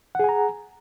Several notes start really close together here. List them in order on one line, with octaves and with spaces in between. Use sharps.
F#5 G#4 G#5 A#5